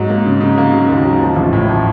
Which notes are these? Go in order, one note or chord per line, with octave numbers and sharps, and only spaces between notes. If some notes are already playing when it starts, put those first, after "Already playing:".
Already playing: G#2 F#3
A#3
C#3
C#3
A#3
F#3
D#2
F#3
F3
A1
A2
F3